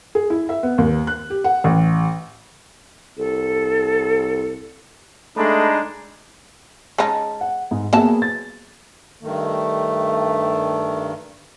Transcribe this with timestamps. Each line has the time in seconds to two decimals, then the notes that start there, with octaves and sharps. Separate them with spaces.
0.15 G#4
0.30 E4
0.49 E5
0.63 B3
0.78 D#2
1.07 F#6
1.30 G4
1.44 F#5
1.64 A1
3.18 C2 A4
5.37 G#3 A3 D4 D#4 B5
6.98 G#3 C#4 D#4 A5
7.41 F#5
7.71 G#2
7.93 F#3 A#3 B3 G#4 E5 A5
8.22 A6
9.22 G2 D#3 A3